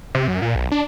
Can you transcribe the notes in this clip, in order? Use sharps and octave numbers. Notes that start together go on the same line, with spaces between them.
C3
F#2
A#2
B1
D4